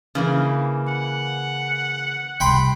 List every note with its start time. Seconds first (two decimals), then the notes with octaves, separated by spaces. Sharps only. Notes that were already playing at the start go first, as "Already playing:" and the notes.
0.15 C#3 E3 A#3
0.89 F#5
2.40 C2 G5 B5 C6